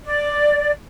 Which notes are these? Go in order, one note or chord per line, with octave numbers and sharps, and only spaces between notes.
D5